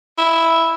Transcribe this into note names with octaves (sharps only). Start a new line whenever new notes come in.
E4